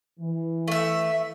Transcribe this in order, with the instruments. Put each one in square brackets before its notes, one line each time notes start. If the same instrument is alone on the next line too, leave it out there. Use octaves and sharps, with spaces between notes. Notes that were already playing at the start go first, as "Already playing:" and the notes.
[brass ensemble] E3
[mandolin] A3 E5